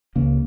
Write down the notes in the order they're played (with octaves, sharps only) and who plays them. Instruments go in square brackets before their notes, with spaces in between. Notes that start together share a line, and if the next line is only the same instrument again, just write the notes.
[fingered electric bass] C#2 C#3 A#3